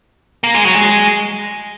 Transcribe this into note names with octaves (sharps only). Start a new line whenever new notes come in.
A#3
G#3
F#3
G#3